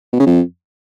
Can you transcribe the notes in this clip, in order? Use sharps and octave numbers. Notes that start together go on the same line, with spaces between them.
B2
C#3
F2